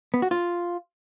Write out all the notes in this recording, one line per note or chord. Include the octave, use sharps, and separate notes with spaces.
B3
F#4
F4